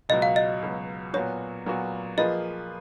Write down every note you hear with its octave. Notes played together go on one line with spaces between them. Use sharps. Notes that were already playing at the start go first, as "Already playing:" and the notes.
C#2 B2 F#3 D#5
F5
D#5
C#2 B2 F#3
A#2 F#3 B3 F#4 C#5
A#2 F#3 B3 F#4
F3 A#3 F4 G#4 B4 D#5